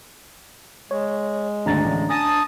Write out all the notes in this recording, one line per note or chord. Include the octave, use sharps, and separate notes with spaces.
G#3 C#5
G#1 D2 D3 D4 A#5 A6
A1 D3
G#5 A5 D#6 A#6